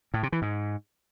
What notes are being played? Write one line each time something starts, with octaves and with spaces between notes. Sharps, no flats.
A2
C3
E3
G#2